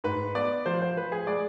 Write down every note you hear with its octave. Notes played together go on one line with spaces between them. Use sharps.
G#2 B4
B3 D5
F3 C5
C5
F3 B4
G#4
G#3 D5